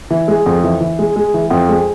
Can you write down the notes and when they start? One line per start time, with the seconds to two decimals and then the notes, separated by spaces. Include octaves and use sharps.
0.10 E3
0.28 G#3
0.46 F2
0.64 E3
0.81 E3
0.99 G#3
1.16 G#3
1.34 E3
1.50 F2
1.69 G#3